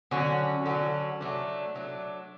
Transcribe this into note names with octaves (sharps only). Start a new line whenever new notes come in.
D3 F#3 C#4 F#4
D3 F#3 C#4 F#4
F#3 A3 D4
F#3 A3 D4